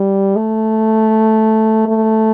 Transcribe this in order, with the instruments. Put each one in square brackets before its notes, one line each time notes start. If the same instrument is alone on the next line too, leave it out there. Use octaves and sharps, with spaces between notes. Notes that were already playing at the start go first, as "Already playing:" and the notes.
Already playing: [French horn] G3
A3
A3